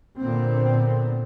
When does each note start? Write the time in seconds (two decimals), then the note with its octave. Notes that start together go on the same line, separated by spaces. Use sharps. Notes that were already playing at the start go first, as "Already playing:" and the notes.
0.19 A#2 D3 B3 C4